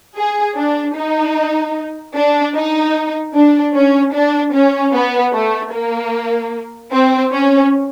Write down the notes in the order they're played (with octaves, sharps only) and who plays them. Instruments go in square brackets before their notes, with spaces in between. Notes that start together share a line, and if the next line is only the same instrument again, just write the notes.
[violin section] G#4
D4
D#4
D4
D#4
D4
C#4
D4
C#4
B3
A3
A#3
C4
C#4